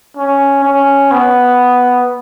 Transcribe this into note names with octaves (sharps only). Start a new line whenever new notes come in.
C#4
C#4
B3